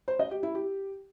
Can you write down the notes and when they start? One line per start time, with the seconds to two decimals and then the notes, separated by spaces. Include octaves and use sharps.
0.08 C5
0.19 D#5
0.31 G4
0.43 E4
0.55 G4